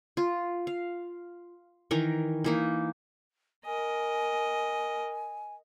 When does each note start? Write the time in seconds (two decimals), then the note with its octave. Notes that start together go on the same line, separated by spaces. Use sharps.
0.17 F4
0.67 F5
1.91 D#3 E3 A#4
2.44 E3 A#3 D#4
3.65 A#4 D#5 G#5